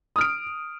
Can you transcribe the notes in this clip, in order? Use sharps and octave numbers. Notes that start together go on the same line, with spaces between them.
D#6 F6 D7